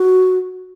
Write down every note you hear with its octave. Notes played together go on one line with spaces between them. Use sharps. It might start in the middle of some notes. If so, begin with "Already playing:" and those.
Already playing: F#4